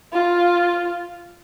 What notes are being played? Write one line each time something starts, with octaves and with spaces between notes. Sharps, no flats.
F4